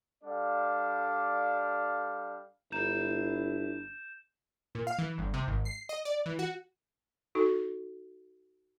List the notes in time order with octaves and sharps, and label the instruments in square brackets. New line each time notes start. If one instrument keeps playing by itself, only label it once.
[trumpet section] G3 D4 A4 D5 F5
[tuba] G1 [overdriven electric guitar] D4 A#5 [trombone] E4 [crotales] G6 E7
[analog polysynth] A#2
F5
E3
G1
C3
G#1
C7
D#5
D5
E3
F#4
[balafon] D#4 F#4 A4